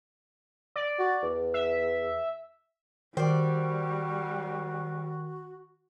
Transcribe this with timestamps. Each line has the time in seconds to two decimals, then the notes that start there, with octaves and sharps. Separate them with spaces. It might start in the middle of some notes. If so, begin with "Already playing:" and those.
0.76 D5
0.99 F#4
1.23 E2
1.54 E5
3.17 D#3 G3 F#4 C5 D5